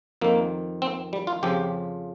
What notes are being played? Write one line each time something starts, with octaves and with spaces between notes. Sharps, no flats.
F2 D#3 A#3
C4
G3
F4
F2 C#3 F3 G4